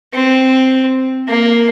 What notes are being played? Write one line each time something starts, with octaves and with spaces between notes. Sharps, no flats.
C4
A#3